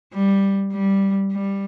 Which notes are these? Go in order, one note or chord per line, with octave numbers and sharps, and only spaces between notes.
G3
G3
G3